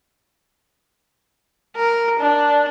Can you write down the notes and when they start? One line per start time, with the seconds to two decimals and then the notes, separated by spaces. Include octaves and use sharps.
1.76 A#4
2.19 D4